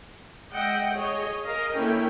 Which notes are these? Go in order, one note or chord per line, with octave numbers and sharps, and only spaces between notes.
G#3 D#5 E5 F#5 G5
G#4 C#5 D#5
G#4 A#4 D#5 F5
D3 A#3 C#4 E4 A#4 G5